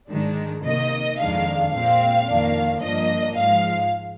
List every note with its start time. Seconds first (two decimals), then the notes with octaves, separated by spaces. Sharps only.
0.10 G#2 D#3 G#3 D4
0.64 C3 D#3 A#3 D#5
1.19 F2 D#3 G#3 D4 F5
1.73 A#2 G#3 C4 F5
2.27 F2 D#3 A#3 D4
2.82 G2 F3 A#3 D4 D#5
3.36 G#2 F3 G#3 F5